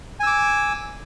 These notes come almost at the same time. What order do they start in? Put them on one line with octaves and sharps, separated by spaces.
G#5 E6 D6